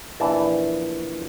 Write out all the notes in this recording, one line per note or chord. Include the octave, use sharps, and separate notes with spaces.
A#1 E3 D5 A5